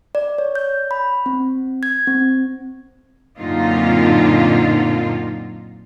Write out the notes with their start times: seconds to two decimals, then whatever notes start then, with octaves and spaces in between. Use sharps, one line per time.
0.15 D5
0.38 C#5
0.55 G6
0.91 B5
1.26 C4
1.83 G#6
2.07 C4
3.38 F#2 A#2 D3 C4 D#4 F4